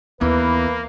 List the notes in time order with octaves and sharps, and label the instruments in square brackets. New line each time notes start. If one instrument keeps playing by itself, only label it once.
[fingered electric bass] D#2 B3 [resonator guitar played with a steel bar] E3 [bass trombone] A#3 [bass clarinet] B4